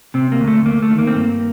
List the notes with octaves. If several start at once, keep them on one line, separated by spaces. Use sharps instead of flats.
C3 C4
A#3
D2
A3
D2 A#3
A3
D#3
A#3
C4
G2 A#3